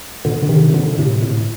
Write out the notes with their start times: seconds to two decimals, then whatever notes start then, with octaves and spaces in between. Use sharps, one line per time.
0.25 A#2 D3
0.43 D3
0.49 C3 D#3
0.74 A#2 D3
0.98 A2 C3
1.23 A2